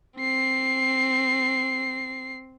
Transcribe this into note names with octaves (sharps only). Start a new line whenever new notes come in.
C4 C7